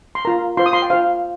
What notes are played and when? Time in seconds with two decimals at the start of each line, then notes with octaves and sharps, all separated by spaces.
0.15 C6
0.25 F4 A#4 A#5
0.57 F4 C5 C6
0.66 D#6
0.73 C6
0.82 G5
0.90 F4 C5 F5